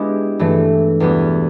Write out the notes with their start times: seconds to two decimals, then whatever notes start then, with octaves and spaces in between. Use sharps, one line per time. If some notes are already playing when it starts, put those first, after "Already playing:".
Already playing: G#3 B3 D4 E4 G4
0.39 G2 E3 A3
1.00 E2 B2 G3 B3